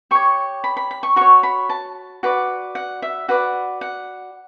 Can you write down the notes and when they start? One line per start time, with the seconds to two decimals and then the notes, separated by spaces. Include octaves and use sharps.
0.11 G4 C#5 C#6
0.64 B5
0.77 B5
0.91 B5
1.03 C#6
1.16 F#4 C#5 C#6
1.43 B5
1.69 A5
2.23 F#4 B4 D5
2.75 F#5
3.02 E5
3.28 F#4 B4 D5 F#5
3.81 F#5